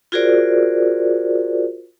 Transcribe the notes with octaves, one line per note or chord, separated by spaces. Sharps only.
F4 F#4 G#4 A#4 C5 D5